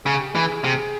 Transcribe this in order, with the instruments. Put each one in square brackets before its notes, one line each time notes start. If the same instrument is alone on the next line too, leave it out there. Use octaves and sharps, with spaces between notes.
[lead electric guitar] C#3 [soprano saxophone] G#4
[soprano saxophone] G4
[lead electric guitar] E3 [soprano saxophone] G#4
[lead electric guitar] C3